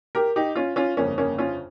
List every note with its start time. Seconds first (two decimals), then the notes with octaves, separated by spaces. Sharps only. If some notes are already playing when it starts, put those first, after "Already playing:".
0.15 G4 A#4
0.36 D#4 G4
0.56 C#4 F4
0.76 C#4 F4
0.97 G1 F2 C#3 A#3 C#4
1.18 A#3 C#4
1.38 C#4 F4